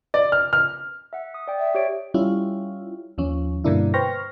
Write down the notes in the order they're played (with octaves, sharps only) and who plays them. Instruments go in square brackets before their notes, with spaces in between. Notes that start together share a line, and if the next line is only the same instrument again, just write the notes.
[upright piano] D5
F6
F6
[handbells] E5 F#5
D#6
D5 G5
[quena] E5
[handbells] G4 C#5 D7
[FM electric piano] G3 C#4 E4 F4
D#2 F3 C#4
G2 B2 D3 A#3 D4 E4
B4 C5 G5 C#6 F6 A#6